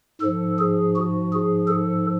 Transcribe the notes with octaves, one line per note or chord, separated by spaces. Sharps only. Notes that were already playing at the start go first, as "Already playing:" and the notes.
G#2 F3 A4
G#4
F#4
G#4
A4